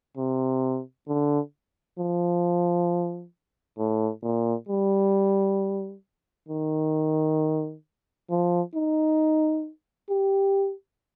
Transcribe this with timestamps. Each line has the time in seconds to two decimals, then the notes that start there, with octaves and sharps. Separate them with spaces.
0.17 C3
1.08 D3
1.98 F3
3.78 A2
4.23 A#2
4.69 G3
6.48 D#3
8.30 F3
8.75 D#4
10.09 G4